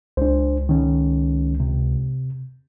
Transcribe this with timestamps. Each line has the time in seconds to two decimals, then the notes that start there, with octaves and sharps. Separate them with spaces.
0.17 C#2 D4 C5
0.69 D#3 C#4
1.60 C3